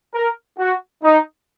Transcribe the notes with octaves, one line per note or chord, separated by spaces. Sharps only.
A#4
F#4
D#4